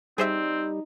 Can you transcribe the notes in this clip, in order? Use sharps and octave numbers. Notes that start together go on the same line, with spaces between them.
G3 C4 D#4 G#4 C5 E5